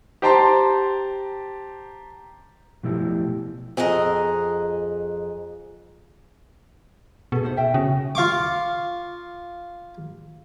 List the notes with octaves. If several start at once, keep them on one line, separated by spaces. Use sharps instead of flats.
G4 C5 G5 A5 A#5 C6
B2 F3 A3 E4 G4
F2 G#4 D#5 F#5 A#5
B2 G#4 A4
D#4 C5 F#5
A#4 E5 G5
C#3 F#4
F4 F5 C#6 D6